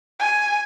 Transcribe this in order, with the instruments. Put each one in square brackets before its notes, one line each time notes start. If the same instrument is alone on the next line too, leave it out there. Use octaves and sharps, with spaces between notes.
[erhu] G#5